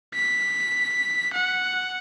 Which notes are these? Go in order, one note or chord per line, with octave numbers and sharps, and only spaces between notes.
B6
F#5